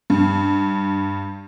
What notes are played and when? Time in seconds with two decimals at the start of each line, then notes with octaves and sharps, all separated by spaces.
0.10 G2